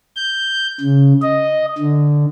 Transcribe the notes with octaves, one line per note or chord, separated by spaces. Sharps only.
G6
C#3
D#5
D3